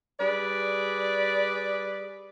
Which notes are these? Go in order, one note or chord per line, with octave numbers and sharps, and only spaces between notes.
G3 G#4 B4 D5